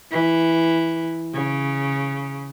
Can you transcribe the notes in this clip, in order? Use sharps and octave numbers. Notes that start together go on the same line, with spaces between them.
E3
C#3